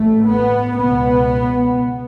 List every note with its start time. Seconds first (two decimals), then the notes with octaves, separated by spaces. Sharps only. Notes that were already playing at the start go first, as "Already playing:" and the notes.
Already playing: A1 A2 A3
0.25 B3
0.77 C#2 B2 B3